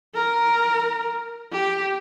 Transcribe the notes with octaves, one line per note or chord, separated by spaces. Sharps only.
A#4
G4